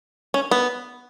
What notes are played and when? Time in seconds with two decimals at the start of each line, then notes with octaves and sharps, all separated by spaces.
0.34 C#4
0.51 B3